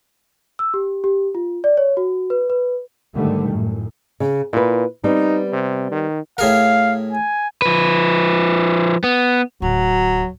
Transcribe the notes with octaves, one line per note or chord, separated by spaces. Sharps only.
E6
G4
G4
F4
D5
C#5
F#4
B4
B4
G#2 D3 D#3 G3 A3
F#2 A2
C#3
A#2 E4 B4
G3 B3 C4 D#4
C3
D#3
A2 G#4 A#4 F5
G#5
F3 B4
B3
D1 F#3